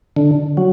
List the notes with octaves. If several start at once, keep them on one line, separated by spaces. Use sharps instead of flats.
D3
F#3